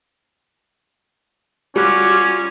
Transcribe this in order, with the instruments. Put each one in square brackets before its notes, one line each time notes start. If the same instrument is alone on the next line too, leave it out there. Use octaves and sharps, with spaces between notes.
[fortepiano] G3 F#6 [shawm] C#4 [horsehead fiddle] F4 F#4 [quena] D6